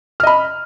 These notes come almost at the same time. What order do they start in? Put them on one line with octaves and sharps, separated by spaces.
F6 D#5 B5